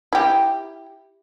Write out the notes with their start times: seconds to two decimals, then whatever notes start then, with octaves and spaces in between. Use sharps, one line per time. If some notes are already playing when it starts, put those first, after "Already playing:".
0.13 E4 G4